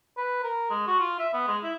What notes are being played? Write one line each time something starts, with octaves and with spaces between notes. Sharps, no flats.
B4
A#4
G#3
F#4
F4
E5
B3
G#3
E4